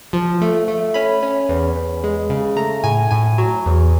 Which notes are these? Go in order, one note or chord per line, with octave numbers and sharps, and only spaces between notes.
F3
A3
A3
C#4 B5
C#4
E2
E2
G#3
C#3
A3 A#5
A2 G#5
A2 G#5
F#3
E2